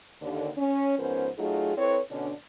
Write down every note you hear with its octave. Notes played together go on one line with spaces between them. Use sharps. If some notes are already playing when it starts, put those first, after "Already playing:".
D#2 D3
C#4
G#2 F3 B3 C#4 A#4 C5
F#3 A3 D#4 F4 G#4
C4 E4 A4 B4 C#5
B2 D3 C#4 D4